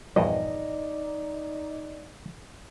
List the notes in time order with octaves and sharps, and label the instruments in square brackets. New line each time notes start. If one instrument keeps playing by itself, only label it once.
[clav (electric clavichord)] A#1 E2 G2 [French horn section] D#4 D5 [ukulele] D#5